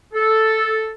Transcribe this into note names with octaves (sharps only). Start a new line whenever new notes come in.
A4